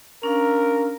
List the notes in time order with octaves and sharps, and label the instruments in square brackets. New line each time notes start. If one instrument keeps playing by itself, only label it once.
[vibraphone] C#4 D4 F5 [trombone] A#4